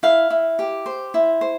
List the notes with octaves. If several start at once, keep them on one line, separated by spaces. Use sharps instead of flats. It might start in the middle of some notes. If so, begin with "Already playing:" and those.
E4 F5
E4
G4
C5
E4
C5